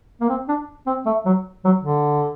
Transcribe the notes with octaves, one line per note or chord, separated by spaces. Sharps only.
A#3
C4
D4
C4
A3
F#3
F#3
D3